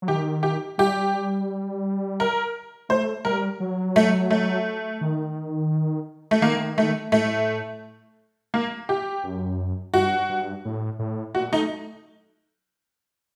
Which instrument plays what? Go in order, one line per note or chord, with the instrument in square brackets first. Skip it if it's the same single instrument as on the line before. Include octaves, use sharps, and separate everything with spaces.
[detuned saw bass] F#3
[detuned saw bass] D#3 [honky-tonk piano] G4
[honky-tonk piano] G4
[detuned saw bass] G3 [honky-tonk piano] G4
[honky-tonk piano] A#4
[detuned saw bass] A3 [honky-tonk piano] C5
[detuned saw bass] G3 [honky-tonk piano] A#4
[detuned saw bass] F#3
[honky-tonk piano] A3
A3
[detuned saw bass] D#3
[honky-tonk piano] A3
[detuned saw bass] D#3 [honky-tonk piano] A#3
[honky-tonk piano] A3
[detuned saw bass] A2 [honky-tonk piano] A3
[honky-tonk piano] A#3
G4
[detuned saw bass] F#2
[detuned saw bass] G2 [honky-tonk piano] F#4
[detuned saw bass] G2
A2
A2
[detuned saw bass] A#2 [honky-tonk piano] F#4
[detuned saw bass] A3 [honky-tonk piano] D#4